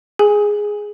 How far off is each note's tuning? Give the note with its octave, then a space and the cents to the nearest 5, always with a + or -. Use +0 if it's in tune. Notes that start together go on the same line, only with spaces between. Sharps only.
G#4 +0 G#5 -10